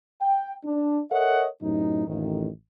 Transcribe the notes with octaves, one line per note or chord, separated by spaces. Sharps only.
G5
D4
A4 A#4 C#5 D#5 E5 F#5
F#2 A2 C3 D#4
A1 F2 D#3